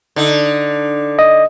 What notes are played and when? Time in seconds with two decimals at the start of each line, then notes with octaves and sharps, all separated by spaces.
0.16 D3 D#4
1.19 D#5